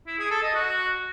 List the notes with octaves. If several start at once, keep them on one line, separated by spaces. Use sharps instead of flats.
E4
G#4
A4
D#5
F#4